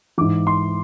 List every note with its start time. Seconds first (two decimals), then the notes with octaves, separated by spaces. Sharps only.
0.18 G#2 E3 D6
0.47 C6